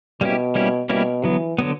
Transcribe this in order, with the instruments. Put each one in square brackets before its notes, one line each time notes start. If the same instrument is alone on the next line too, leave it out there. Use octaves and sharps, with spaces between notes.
[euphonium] B2 [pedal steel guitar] G3 A#3 C#4 E4 G4
[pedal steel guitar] G3 A#3 C#4 E4 G4
[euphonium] B2 [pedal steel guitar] G3 A#3 C#4 E4 G4
[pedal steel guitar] D3 F#3 B3 [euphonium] E3
[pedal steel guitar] D3 F#3 B3